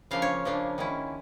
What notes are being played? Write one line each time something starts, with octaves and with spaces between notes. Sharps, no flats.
C#3 F3 A#3 D4 F5
C#5
C#3 F3 A#3 D4
D#3 G#3 C#4 E4